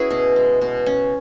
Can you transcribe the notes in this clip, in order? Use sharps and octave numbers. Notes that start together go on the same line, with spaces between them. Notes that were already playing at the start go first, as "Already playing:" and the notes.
Already playing: C#4 E4 F#4 G#4 B4
B2
G#3
B2
C#4